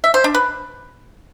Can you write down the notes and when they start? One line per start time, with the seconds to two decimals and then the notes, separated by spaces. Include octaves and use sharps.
0.04 E5
0.14 C5
0.24 D4
0.34 B4